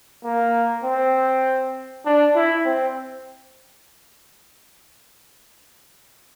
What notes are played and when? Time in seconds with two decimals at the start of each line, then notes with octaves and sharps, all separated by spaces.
0.24 A#3
0.84 C4
2.05 D4
2.35 E4
2.65 C4